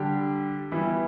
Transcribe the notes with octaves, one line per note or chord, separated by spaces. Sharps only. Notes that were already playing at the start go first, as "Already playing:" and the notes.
Already playing: D3 G3 D4 G4
E3 G3 B3 E4